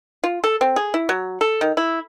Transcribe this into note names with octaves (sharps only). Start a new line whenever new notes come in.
F4
A4
C4
G#4
E4
F#3
A4
D#3
E4